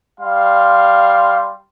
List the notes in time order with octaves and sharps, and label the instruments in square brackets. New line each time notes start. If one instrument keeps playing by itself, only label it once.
[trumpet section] G3 F5 C6